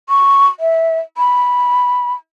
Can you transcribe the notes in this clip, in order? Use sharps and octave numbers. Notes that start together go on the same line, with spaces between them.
C#6
E5
B5